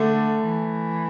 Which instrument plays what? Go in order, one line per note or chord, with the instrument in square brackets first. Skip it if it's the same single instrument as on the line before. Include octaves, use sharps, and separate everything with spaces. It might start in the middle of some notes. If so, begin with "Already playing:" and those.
Already playing: [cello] D3 [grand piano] A3
[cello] E3